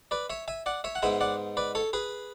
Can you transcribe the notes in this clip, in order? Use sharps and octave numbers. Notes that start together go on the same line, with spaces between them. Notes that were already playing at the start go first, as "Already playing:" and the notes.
B4 D5
C#5 E5
E5 G#5
D5 F#5
C#5 E5
F#5
G#2 G#3 B3 E5 G#5
D5 F#5
B4 D5
A4 C#5
G#4 B4